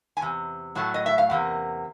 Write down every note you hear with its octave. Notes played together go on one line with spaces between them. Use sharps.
G#5
E2 C3
A2 F#3 A3
D#5
E5
F5
E2 C3 A#3